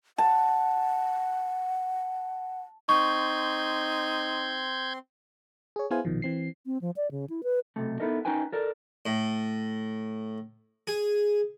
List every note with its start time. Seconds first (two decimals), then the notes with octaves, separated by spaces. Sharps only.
0.18 F#5 A5
2.89 C4 D#4 C6 C#6 G6 G#6
5.76 G#4 C#5
5.91 B3 E4 G#4 C5 F5 G#5
6.05 A#1 B2 D#3 F3
6.22 E3 C4 C7
6.66 C4
6.81 F3
6.96 D5
7.11 C#3
7.30 E4
7.43 B4
7.76 B1 C3 A3
8.00 B3 D#4 E4 A4 A#4 D#5
8.25 C#4 D#4 A#4 B4 G5 G#5
8.52 A4 A#4 D5
9.06 A2
10.87 G#4